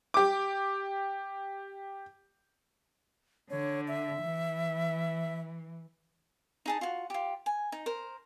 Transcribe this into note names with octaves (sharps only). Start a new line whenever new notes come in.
G4 D6
D3 C#5
E5
E3
D#4 G#4 A5
F4 F#4
F4 G4
G#5
D#4
A#4 C5